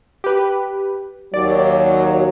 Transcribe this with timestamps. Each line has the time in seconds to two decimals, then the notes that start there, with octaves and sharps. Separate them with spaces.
0.24 G4 B4
1.34 D#2 F#3 D5